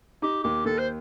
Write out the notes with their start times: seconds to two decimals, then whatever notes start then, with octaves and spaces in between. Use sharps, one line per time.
0.22 D#4 G4
0.44 D#2 G4
0.65 D#2 A4
0.78 C5